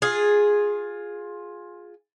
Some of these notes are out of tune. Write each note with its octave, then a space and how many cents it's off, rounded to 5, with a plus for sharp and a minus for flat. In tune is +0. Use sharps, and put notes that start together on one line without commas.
F4 +15 G#4 +0